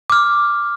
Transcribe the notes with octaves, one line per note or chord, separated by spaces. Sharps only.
D6 F6